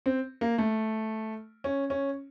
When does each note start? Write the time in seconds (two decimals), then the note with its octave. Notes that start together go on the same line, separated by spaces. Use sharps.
0.06 C4
0.41 A#3
0.58 A3
1.64 C#4
1.90 C#4